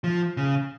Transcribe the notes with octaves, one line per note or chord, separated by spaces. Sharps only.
F3
C#3